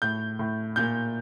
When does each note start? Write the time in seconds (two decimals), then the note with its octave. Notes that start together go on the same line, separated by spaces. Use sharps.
0.02 A2 G6
0.39 A2
0.76 A#2 G6